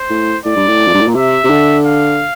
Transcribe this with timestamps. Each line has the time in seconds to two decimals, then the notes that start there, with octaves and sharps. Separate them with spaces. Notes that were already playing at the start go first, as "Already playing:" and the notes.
Already playing: C5
0.10 A2
0.45 A2 D5
0.56 G2
0.67 A2
0.87 F2
0.94 G2
1.01 A2
1.07 A#2
1.15 C3 E5
1.44 C3
1.50 D3
1.85 F5